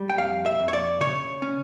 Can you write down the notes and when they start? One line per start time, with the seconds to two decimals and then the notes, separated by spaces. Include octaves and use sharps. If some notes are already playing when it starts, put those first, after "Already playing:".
Already playing: G3
0.09 G5
0.18 F2 F5
0.46 E5
0.59 F2
0.68 C#5
0.73 D5
1.01 C#3 C#5
1.42 C#4